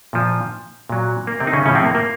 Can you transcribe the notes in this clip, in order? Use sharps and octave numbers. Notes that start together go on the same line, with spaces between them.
A#2 F3
A#2 F#3
A#3
C3 C4
D#4
C#3 C#4
A2 C#3 F3 C#4
C3 C4
A#3
A#3